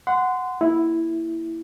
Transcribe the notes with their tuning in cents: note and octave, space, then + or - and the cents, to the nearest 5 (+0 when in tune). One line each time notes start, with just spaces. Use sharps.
F#5 -5 C6 -25
A#3 +0 E4 +0